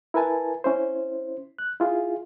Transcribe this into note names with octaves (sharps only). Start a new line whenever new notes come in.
E4 A#4 B4 G#5 A5
C#4 E4 C5
F#6
E4 F4 G#4